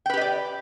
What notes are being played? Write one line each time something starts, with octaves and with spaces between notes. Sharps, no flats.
G4 B4 D5 D#5 G5